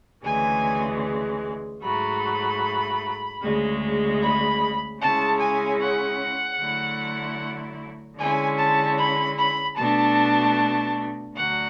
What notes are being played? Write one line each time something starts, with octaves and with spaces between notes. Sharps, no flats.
D2 C#3 E3 G#3 G#5
G#2 F#3 A3 B5
D2 C#3 G#3
B5
C#3 G#3 C#4 E4 A5
G#5
F#5
D3 F#3 A3 E4
D3 G#3 C#4 E4 G#5
A5
B5
B5
B2 A3 D4 A5
D2 D3 F#3 F#5